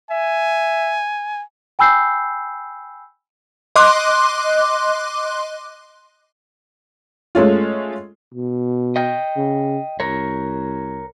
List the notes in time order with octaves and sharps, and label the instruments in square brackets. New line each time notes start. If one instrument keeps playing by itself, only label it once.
[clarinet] E5 [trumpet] G#5
[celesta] G5 G#5 B5 E6 G6 C7
[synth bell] D#5 C6 D6 F#6
[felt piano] G#3 A3 C#4 F4
[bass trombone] B2
[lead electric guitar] D#5 G5
[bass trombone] C#3
[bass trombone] C2 [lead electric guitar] A#4 C#5